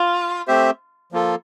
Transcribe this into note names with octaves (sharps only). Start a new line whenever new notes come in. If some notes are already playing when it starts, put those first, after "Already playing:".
Already playing: F4
A3 C4 G4 C5 E5
F3 A#3 F4 A4